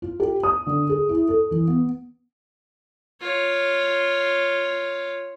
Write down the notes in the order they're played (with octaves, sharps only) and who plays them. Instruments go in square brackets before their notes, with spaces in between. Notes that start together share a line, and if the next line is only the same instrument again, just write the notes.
[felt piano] F4
G4
D#6
D3
G#4
E4
A4
E3
B3
[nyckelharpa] F4 C#5